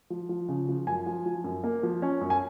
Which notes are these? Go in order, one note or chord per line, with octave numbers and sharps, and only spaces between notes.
F3
F3
C#3
F3
F#2 G#5
F3
F3
F#2
A#3
F3
C#4
F#2
G#5